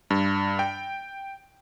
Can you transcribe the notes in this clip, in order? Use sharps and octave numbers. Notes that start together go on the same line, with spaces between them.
G2
G5